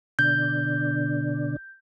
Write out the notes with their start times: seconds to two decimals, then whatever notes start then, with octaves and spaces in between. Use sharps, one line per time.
0.19 B2 D3 D4 G6